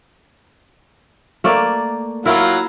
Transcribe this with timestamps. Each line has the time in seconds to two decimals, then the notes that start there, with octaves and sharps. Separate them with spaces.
1.44 A3 A#3 D5
2.26 F#3 E4 F4 A#4 F#5